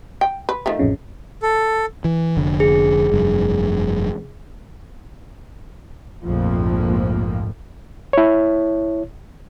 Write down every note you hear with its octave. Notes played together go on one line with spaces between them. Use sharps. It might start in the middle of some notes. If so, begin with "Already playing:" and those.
G5
B4
D#3 F3 A3
A1 F2 C#3
A4
E3
F1 D3
G#4
F1 G2
A#1 F2 G#2 F3 A3 A#3
E4 C#5